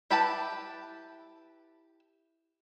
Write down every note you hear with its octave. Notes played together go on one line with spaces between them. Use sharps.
E4 G4 B4 G5 A5